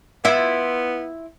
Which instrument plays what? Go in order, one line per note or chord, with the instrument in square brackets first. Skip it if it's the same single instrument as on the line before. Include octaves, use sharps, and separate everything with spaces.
[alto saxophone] B3 [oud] E4 F4 E5